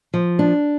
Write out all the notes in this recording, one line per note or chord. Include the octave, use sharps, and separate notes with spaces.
F3
D4